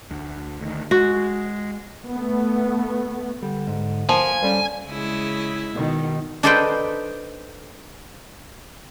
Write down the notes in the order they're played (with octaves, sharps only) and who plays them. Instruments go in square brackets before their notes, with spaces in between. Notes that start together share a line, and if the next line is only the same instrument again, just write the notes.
[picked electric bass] D2
D2 D#3
[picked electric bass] G#3 [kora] F#4
[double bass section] A3 B3
[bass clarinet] D3 [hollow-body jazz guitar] G3
[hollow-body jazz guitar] G#2
[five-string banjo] F3 [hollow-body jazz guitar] A#3 [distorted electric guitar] G#5
[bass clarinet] G3 [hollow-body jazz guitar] C#4 A4 C5
[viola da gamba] C#3 G#3 E4
[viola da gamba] B2 [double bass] D#3
[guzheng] D4 D#4 A4 B4 C5 G5